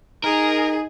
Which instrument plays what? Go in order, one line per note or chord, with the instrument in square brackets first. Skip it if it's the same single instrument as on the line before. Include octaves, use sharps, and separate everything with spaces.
[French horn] D#4 [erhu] G#4 [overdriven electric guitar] A#4